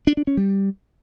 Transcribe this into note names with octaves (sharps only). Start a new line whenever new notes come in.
D4
D4
C#4
G3